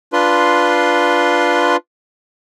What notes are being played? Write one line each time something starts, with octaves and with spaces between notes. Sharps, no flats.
D4 F4 B4 C6